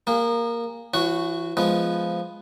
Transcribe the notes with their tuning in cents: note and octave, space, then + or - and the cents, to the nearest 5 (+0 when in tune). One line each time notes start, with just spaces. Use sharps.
A#3 +0 G#4 -35
E3 +30 F#4 -10 C#5 +0
F3 -5 G#3 +5 B3 +0